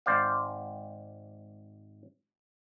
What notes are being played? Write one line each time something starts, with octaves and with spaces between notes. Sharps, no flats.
G#1 C5 D5 F5